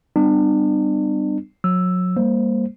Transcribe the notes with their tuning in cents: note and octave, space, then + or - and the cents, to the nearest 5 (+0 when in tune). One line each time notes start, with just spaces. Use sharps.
G3 +0 B3 +40 D4 +40
F#3 -25 E6 +0
G3 +30 A#3 +0 C5 +0